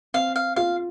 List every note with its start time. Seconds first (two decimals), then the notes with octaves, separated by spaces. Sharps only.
0.14 C4 F5
0.36 F5
0.56 F4 F5